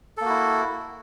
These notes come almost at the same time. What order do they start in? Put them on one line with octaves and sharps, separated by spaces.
A4 A#3 F#4 E4